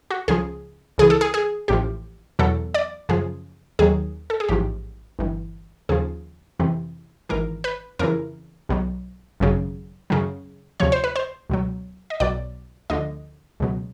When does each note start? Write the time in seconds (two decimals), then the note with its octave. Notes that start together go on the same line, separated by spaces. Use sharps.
0.11 F#4
0.28 C#2 C#3 F3 G#4
0.98 C#2 C#3 E3 G#4
1.10 A4
1.21 G#4
1.34 G#4
1.68 A1 A2 F3 G4
2.39 E2 B2 F#3 A4
2.74 D5
3.09 F#2 C#3 F3 G#4
3.79 D#2 D#3 F#3 G#4
4.30 A4
4.40 G#4
4.49 A1 G#2 F3 G4
5.19 G1 G2 E3
5.89 D#2 C#3 F3 G#4
6.60 F2 C3 E3
7.29 G#1 G#2 E3 A#4
7.64 B4
7.99 F2 C#3 E3 A#4
8.69 B1 B2 F#3
9.40 G#1 F#2 C#3 F#3
10.10 F#2 C#3 F#3
10.80 D2 C3 F3 C#5
10.92 C5
11.04 B4
11.16 C5
11.50 C#2 B2 F#3
12.10 D#5
12.20 B1 B2 F#3 D5
12.90 D2 D3 F3 D#5
13.60 C#2 B2 F#3